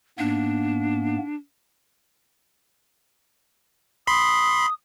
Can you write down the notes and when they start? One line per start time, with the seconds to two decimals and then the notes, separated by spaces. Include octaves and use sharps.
0.19 G#2 A#3 B3 D4
4.07 B5 C6 D#6